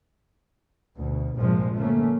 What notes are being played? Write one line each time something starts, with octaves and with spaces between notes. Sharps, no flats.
D2 B2
A#1 G2 C3 F3 G#3
D3 A3 A#3 C#4